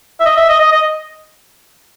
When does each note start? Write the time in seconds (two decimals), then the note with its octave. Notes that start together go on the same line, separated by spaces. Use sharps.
0.20 E5
0.26 D#5
0.37 E5
0.49 D#5
0.60 D#5
0.72 D#5